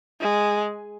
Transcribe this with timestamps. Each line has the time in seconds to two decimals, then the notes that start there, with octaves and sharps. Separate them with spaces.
0.21 G#3